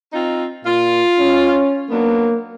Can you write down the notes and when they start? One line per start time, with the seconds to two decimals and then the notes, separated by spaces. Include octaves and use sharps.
0.13 C4 D#4 F4
0.64 A#2 F4
1.19 C#4
1.90 F#3 A#3 B3 D4